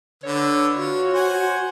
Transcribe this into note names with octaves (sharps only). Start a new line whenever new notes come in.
D3 B4 C#5
F4 F#4
C5 F#5 G#5